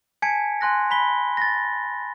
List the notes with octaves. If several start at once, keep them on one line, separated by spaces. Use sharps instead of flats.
G#5 A5 G#6 B6 C#7 D7
G#5 C6 F#6 A#6
B5 B6 G7
A6 A#6